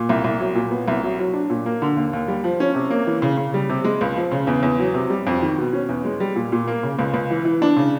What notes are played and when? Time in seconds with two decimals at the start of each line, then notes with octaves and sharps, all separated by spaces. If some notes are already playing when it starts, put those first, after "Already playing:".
Already playing: A#2
0.09 C2
0.24 C2
0.40 F#3
0.55 A#2
0.71 B3
0.88 C2
1.03 F#3
1.19 F#3
1.34 D4
1.50 A#2
1.66 A#3
1.82 D3
1.97 D#2
2.13 D#2
2.28 G3
2.44 F3
2.60 C#4
2.75 C3
2.90 A#3
3.07 E3
3.22 C#3
3.37 C#3
3.54 G3
3.70 C3
3.84 G#3
4.01 C#2
4.16 F3
4.31 C#3
4.47 E2
4.63 E2
4.79 F#3
4.94 C3
5.10 G3
5.27 F2
5.42 D#3
5.58 B2
5.73 C#4
5.89 E2
6.05 G#3
6.20 G3
6.36 A#2
6.52 A#2
6.68 A#3
6.83 C#3
6.99 C#2
7.14 C#2
7.30 E3
7.45 E3
7.62 D4
7.77 C#3